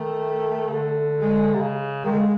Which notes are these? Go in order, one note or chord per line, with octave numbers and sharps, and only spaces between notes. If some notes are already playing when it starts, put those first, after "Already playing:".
Already playing: D#3 A3
C#3
D3
G#3
C3
C#3
D#3 G#3
D3
C#3